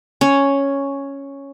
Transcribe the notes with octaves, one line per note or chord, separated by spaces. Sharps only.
C#4